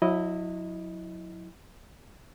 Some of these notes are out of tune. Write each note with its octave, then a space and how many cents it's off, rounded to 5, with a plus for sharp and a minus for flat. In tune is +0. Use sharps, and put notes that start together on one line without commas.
F#3 -35 E4 -10 D#5 +0